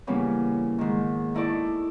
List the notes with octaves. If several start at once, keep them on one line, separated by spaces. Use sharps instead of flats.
C#3 E3 G3 A#3 B3 C#4
G#2 D#3
D#4 E4 A4 D5 C#6